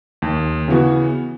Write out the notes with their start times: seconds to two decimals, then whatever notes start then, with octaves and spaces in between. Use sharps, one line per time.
0.22 D#2
0.68 C#3 E3 B3 F#4